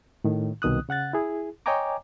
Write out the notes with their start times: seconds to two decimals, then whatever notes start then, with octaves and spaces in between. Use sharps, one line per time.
0.24 A2 D#3
0.62 C2 B2 D#3 D#6 F#6
0.89 C#3 F#5 F#6 A6
1.13 E4 G#4
1.66 C#5 D#5 G5 G#5 A#5 D6